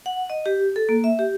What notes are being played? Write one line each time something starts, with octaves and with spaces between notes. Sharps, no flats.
F#5
D#5
G4
A4
A#3
E5
G4